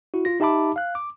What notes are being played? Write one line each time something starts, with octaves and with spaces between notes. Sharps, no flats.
E4 F#4
F4 A#6
D#4 G4 E5 A5 B5 D6
F5 F#6
D6